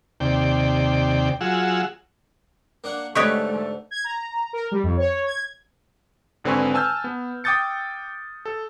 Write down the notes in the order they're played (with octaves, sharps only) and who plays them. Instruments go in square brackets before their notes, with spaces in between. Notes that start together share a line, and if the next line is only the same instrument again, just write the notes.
[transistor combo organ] D#2 C3 D5 G5
F#3 F4 G#4 F#5 E6
[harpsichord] A#3 D4 F#5
[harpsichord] G#2 D3 [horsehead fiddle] A3 [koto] G4 B4 C#5 [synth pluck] D#5 C#6
[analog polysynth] G#6
A#5
A#4
G3
F2
C#5
G#6
[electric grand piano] G#1 D3 C4 B4 G#5 C#6
G#5 A5 E6 F6 G6
B3
G5 D6 D#6 G6 A6 C#7
A4